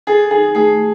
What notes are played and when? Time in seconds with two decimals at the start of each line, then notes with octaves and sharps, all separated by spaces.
0.07 G#4 A4
0.31 D#4 G#4
0.55 A3 G#4